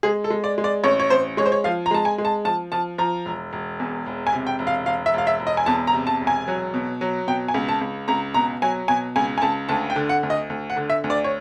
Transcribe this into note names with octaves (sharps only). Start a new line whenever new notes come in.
G#3 G#4
A4
G#3
D5
G#3
D5
A1 C#5
C#5
A1 C5
G#3 C#5
C5
C#5
F3 F5
A#5
G#3 A5
G#5
G#3
A5
F3 A5
F3 A5
F3 A#5
E1
E1
E2
E1
G#5
C3
G5
E1
F5
E1 F5
E5
E1 F5
E5
E1
D#5
G#5
E2 A5
A#5
C3
A5
E1
G#5
F#3
B2
F#3
B2 G5
G#5
C#2
A5
C#2
C#2 A#5
B2 A#5
F#3 G#5
B2 G#5
C#2 G#5
G#5
C#2 A5
D2 A5
G5
D3
F#5
D2
D#5
D2
F#5
D3
E5
D2
D5
C#5